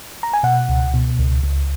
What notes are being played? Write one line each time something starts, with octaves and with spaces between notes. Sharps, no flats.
A#5
G#5
B2 F#5
C#2
B2
C#2
C#2